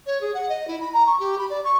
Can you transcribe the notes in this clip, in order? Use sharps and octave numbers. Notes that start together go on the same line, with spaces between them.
C#5
G#4
F#5
D#5
E4
B5
A#5
C#6
G4
B5
D5
C#6